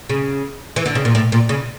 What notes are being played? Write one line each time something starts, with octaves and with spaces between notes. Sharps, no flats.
C#3
E3
D3
C#3
A#2
A2
A#2
C#3